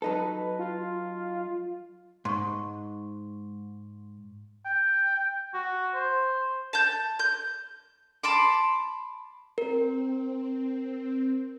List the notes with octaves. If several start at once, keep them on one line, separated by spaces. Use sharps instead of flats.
F#3 D#4 A4 B4
F4
G#2 C6 C#6
G5
F#4
C5
A5 G6
G6
A5 B5 C6 D6
C4 A#4